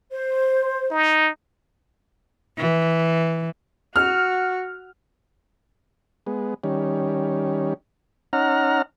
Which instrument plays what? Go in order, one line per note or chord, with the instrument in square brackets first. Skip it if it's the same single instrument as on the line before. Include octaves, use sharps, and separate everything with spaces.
[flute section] C5
[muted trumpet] D#4
[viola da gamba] E3
[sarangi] F#4 [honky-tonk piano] F6
[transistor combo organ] G#3 B3
D#3 G3 C#4
C#4 D#4 F#5 A#5 F6